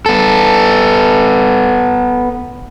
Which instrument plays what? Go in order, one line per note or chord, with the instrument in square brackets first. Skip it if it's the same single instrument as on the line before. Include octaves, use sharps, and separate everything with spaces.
[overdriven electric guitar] B3 A4